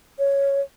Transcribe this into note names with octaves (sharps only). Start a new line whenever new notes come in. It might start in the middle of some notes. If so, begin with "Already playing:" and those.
C#5